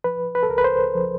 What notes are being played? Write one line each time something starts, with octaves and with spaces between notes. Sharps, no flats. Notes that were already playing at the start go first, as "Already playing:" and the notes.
F3 B4
B4
A4
C#2 A#4
B4
C5
F3